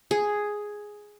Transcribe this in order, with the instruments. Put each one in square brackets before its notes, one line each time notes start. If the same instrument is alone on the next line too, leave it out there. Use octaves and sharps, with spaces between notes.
[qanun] G#4